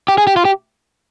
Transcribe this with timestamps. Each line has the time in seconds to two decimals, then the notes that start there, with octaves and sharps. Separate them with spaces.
0.08 G4
0.18 G#4
0.27 G4
0.37 F4
0.45 G4